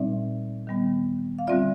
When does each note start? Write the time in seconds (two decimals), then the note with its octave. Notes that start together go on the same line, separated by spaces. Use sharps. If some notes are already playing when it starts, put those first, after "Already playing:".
Already playing: A#2 G3 C4 D#4 D5 E5
0.67 D#3 G3 B3
1.39 F5
1.47 D3 G3 C4 F4 D5 E5